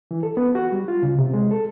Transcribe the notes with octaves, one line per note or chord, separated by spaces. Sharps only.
E3
A4
B3
F#4
G3
F4
C#3
C3
G#3
A4